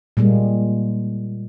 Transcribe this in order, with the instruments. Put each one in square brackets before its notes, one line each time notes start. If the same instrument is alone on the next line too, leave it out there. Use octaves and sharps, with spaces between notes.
[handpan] A#2 G3 G#3 A#3